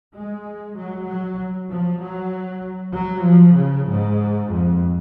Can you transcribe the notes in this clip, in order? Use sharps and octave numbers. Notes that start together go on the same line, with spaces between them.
G#3
F#3
F#3
F3
F#3
F#3
F3
C#3
G#2
F2